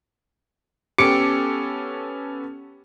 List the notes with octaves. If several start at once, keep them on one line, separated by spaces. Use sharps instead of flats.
B3 C#4 G4 A4 D6 C#7